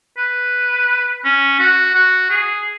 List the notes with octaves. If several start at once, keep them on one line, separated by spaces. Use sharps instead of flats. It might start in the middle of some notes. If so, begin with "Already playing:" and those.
B4
C#4
F#4
F#4
G#4